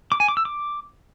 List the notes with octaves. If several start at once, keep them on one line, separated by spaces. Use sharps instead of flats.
D6
G#5
D6
E6
D6